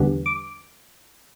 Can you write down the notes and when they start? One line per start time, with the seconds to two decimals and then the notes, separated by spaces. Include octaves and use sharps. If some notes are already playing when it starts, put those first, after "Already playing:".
Already playing: E2 D3 G3 B3
0.26 D6